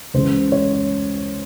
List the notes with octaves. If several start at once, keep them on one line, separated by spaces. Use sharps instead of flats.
C#2 C#3 E3 G#3 C5
C#5